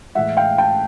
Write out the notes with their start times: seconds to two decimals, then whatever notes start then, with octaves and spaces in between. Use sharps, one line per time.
0.15 A2 E3 G#3 E5 F#5
0.37 F5 G5
0.58 G5 A5